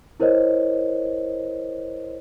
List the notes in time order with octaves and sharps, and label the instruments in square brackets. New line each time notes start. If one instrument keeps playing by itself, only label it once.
[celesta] E4 A#4 C5 C#5 D#5